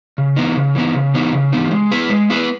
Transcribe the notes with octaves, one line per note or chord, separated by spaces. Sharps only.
C#3
E3 B3 D#4
C#3
E3 B3 D#4
C#3
E3 B3 D#4
C#3
E3 B3 D#4
G#3
B3 E4 G#4 B4
G#3
B3 E4 G#4 B4